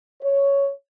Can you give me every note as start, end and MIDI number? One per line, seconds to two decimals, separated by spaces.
0.23 0.70 73